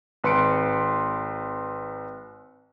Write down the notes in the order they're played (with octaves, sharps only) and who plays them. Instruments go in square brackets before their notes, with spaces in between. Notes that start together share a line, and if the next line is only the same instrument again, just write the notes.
[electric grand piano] G#1 B4 C6 C#7 D7